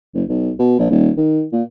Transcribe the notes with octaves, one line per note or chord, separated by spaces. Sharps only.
F#1
B1
B2
A#1
D#1
D#3
A#2